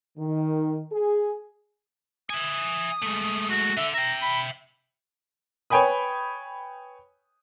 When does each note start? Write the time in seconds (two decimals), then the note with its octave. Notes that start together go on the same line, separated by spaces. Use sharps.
0.17 D#3
0.92 G#4
2.30 E5 G#5 D#6
3.02 G#3 A3
3.50 F#4
3.77 D3 E5
3.94 E5 G5 A#5
4.22 B5
5.70 B4 C#5 G5 G#5 B5 D#6